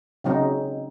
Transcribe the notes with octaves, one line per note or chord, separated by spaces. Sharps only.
C#3 F#3 C4 D#4